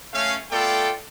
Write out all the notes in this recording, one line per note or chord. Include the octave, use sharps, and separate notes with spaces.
A3 C#4 F5
A3 B3 F4 A4 D5 G5